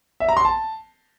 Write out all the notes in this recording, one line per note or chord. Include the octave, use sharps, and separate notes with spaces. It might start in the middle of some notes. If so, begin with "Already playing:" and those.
E5
A#5
C6
A5